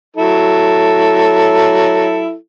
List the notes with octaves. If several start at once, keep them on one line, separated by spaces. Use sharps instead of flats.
F#3 E4 A4